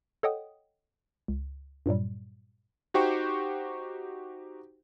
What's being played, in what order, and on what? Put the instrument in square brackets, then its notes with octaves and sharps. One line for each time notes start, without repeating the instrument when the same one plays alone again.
[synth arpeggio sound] A4 C#5 D#5 F#5 G5 D#6
C#2
G2 A#2 F#3 G3
[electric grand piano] D#4 F#4 G4 C5 G5 C#6